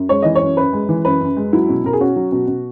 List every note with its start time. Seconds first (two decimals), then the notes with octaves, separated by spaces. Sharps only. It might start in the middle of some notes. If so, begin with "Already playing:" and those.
Already playing: F#2
0.09 G#3 C#5
0.22 E3 D#5
0.35 C#5
0.41 F#2
0.57 F#2 B4
0.73 G#3
0.89 E3
1.05 F#2 B4
1.21 F#2
1.37 G#3
1.53 F#3 E4
1.69 B2
1.84 B2 A#4
1.93 G#4
2.00 C#4 F#4
2.16 F#3
2.32 B2
2.48 B2